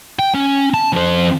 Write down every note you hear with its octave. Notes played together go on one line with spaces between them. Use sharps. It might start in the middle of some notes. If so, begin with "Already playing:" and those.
G5
C#4
A5
F2 C5